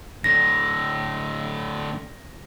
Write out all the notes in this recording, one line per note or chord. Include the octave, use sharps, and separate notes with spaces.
A2 D3 A#6